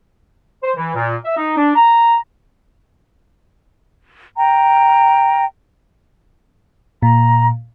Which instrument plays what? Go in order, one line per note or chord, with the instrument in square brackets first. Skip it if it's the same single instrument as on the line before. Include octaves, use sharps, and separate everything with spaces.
[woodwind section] C5
E3
A#2
E5
D#4
D4
A#5
[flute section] G5 A#5
[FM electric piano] A#2 [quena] A#5